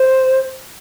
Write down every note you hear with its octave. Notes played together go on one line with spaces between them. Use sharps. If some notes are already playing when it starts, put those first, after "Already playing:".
Already playing: C5